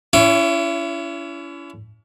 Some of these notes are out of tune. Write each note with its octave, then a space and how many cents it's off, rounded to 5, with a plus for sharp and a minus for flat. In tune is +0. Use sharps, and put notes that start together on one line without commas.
C#4 +40 E4 +35 C#5 +0